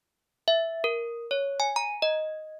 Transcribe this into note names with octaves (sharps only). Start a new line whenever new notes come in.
E5
A#4
C#5
G#5
A#5
D#5